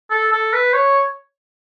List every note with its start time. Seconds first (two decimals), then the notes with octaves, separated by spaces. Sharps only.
0.11 A4
0.32 A4
0.53 B4
0.73 C#5